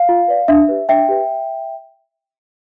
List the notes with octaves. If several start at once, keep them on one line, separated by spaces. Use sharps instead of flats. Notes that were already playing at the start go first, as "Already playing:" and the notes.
Already playing: F5
F4
B4 D5
D4 E5
G4 B4
D4 E5 G5
G4 B4